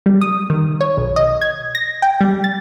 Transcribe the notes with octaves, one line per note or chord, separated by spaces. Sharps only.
G3
D#6
D#3
C#5
B1
D#5
G#6
A#6
G5
G3
A6